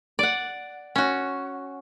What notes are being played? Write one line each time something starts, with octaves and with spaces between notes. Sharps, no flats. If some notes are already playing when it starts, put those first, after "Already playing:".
D5 F#5
C#4 F#4